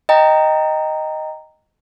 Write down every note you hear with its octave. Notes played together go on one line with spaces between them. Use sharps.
D#5 G5 A#5